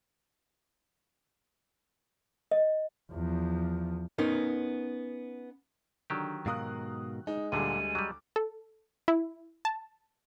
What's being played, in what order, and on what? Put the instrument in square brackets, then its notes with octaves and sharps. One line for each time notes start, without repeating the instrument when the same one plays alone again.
[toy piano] D#5
[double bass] E2 F3
[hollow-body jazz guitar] B3 C#4 D#4 A#4
[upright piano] D3 [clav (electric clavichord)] D#3 F#3 G4
[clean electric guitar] G#2 B2 A#4 [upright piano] F5 D#6 F#6
[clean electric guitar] G#3 [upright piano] D#4
[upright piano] D2 G3 G#4 [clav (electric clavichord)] A#2 D3 [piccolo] D#7
[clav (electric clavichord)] F#3 G3 [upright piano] D6
[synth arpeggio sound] A4
E4
A5